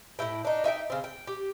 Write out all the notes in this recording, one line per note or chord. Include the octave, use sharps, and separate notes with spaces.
A2 G3 E4 G5
D4 D#4
D#4 E5 F5 G5
C#3 C4
G5
G4